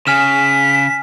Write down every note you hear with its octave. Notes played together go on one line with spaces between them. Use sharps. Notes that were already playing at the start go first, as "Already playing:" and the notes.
C#3 G#5 F6 B6 E7